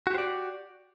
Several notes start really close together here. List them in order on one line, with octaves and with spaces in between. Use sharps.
F#4 G4 C5 D5